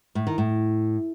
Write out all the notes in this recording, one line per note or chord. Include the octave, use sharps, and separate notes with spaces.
A2
D#3
A2